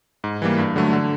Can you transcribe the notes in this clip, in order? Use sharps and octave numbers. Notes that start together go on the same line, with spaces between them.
G#2
E3 G3 A#3
G2
D3 F#3 A3
D3